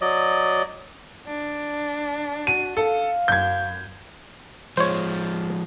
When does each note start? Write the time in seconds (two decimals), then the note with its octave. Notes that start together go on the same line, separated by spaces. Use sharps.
0.01 F#3 D5 D#5
1.26 D4
2.47 F#4 D#7
2.77 A4 F5
3.28 F#2 G6 G#6
4.77 F3 G#3 C5 C#5